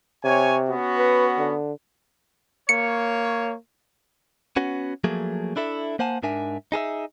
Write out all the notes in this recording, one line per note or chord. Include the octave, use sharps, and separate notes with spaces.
C3 C#5 G#5
B3 C#4 F#4
B4
D3
A#3 C#5 C#7
B3 C#4 F#4
F3 F#3 A3 A#3 G#4
D4 E4 A4 E5
A#3 C5 F#5 G#5 A5
G#2 G#3 D4 A#4 E5 G#5
D#4 G#4 A4 E5